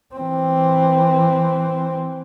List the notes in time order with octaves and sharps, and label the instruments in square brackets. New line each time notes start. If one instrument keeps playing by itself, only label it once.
[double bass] E3 C4